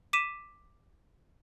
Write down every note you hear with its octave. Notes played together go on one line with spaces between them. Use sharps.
D6 B6 D#7 E7